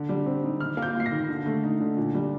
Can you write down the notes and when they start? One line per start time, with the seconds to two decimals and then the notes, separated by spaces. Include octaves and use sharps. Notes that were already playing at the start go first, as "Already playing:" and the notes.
Already playing: D3
0.09 G3
0.26 C4
0.43 D#4
0.60 D#3 F6
0.77 A#3
0.82 G6
0.95 F4 C7
1.06 A#6
1.12 D#3
1.29 D3
1.46 A3
1.64 D#4
1.80 D3
1.97 A#2
2.15 G3